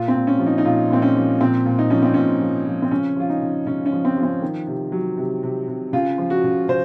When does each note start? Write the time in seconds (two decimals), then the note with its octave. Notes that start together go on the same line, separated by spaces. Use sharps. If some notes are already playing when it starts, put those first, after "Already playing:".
Already playing: A#2 F4
0.08 C4
0.14 A#2
0.27 C#4
0.39 F3
0.46 D#4
0.58 D#4
0.65 A#2 F4
0.91 A#2 C4
1.02 C#4
1.15 F3
1.41 A#2 C4
1.66 A#2
1.79 D#4
1.90 F3 C#4
2.02 C4
2.14 A#2 C#4
2.41 F3
2.66 F3
2.82 C4
2.91 C#3 C#4
3.16 F3 F4
3.30 D#4
3.42 C#3
3.67 C#3 C#4
3.86 C#4
3.92 F3
4.05 C4
4.17 F3
4.23 C4
4.42 D#3
4.67 C3
4.92 F#3
5.18 C3
5.43 C3
5.68 C3
5.93 C#3 F4
6.18 F3
6.30 F#4
6.44 C#3
6.68 C#3 C5